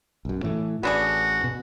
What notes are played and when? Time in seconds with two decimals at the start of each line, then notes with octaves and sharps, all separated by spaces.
0.25 B1 F#2
0.42 A2 E3 A3
0.83 A1 B3 D4 F#4 G#4
1.44 B2